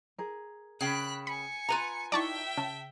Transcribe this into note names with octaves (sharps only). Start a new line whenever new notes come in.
G#4 A#4
C#3 G5 B5 F#6 C7
G#5 B5 C#7
F4 B4 A#5
D#4 E4 F#4 D5 E5 G5 A5 C#6
C#3 A5